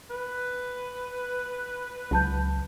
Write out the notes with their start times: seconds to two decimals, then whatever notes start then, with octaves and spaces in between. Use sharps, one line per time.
0.10 B4
2.11 C#2 F#3 A5 G6